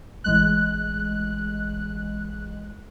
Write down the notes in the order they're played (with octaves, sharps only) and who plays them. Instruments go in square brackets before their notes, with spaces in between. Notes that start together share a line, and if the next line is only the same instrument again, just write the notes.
[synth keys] A1 G#3 F#6